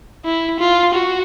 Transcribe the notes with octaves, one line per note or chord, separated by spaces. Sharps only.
E4
F4
F#4